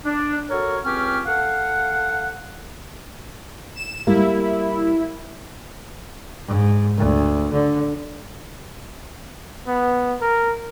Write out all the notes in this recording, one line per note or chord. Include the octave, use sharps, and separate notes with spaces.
D4
F#4 A4 A#4 C#5
C#2 C4 C#4 G4 F6
A4 F5 F#5
E7
G3 A#3 E4
G#2
D2
D3
B3
A#4